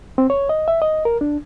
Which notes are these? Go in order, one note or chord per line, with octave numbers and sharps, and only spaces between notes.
C4
C#5
D#5
E5
D#5
A#4
D4